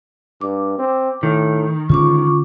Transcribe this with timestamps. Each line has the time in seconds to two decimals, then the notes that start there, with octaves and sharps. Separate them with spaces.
0.41 G2 D6
0.79 C4
1.23 A2 D#3
1.90 G#2 D3 C#4 F4 C#6 D6